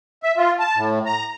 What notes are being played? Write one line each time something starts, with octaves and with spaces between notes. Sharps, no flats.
E5
F4
A5
A2
A#5